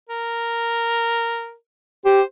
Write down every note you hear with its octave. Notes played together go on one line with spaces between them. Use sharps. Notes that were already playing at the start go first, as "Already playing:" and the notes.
A#4
G4 C5